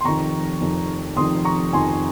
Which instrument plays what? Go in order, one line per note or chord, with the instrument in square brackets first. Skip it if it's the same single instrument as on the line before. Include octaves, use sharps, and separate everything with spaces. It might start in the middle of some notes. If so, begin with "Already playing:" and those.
[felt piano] C6
F1 F2 D#3 A#5 C#6
F1 F2 D#3
F1 F2 D#3 C6 D#6
A#5 C#6
F1 F2 D#3 G#5 C6